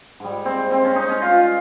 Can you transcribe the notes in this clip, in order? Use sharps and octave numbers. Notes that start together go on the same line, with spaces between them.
G#2 G3
C4
C4
C#4
D#4
C#4
F4